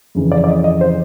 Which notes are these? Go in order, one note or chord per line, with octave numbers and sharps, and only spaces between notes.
F2 C#3 E3
D5
D5
D#5
D#5
C5